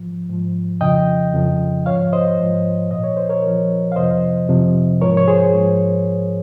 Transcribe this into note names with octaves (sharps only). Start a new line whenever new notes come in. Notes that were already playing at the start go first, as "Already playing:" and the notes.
Already playing: G#2 F3
G#2 F3
F2 C#3 F3 D#5 G5
F2 C#3 F3
G#2 F3 C#5 F5
C5 D#5
G#2 F3
A#2 F3 D#5
C#5
C5
A#4 C#5
A#2 F3
F5
F2 C3 F3 C5 D#5
F2 C3 F3
G#2 F3 A#4 C#5
C#5
G#4 C5
G#2
F3